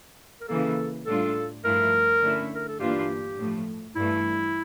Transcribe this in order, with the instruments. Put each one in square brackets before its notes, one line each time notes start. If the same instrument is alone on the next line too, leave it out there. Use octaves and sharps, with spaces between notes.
[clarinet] A#4
[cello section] C#3 E3 A#3 [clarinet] A4
[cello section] A2 G3 D4 F4 [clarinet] A4
[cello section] G2 F3 A3 E4 [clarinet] A#4
[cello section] D3 A3 C#4 E4
[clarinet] A#4
A4
[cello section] G2 E3 A#3 D4 F4 [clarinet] G4
[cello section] A2 F3 A3
[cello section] G2 E3 A3 [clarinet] E4